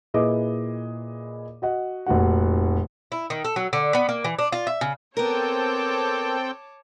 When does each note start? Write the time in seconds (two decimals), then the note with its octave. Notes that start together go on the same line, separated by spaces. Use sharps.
0.14 A#2 E4 G#4 B4 D#5 D6
1.62 F#4 D#5 F#5
2.06 F1 A#2 F#4 F#5
3.12 E4
3.30 D#3
3.44 A4
3.56 F#3
3.73 D3
3.95 B3
4.09 A#3
4.24 E3
4.39 D4
4.52 F4
4.67 E5
4.81 C#3
5.17 B3 C4 A4 A#4 C#5 G5 A5 D6